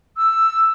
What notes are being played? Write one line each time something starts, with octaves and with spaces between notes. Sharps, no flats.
E6